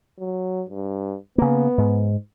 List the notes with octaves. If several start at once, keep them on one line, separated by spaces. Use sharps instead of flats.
F#3
G2
C#3 A#3 B3
G#2